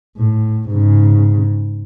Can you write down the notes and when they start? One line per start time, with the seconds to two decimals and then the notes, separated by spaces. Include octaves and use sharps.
0.18 A2
0.69 G#2 C#3